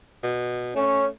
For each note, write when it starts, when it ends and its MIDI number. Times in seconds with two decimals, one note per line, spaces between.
0.23 0.73 47
0.76 1.10 57
0.76 1.05 61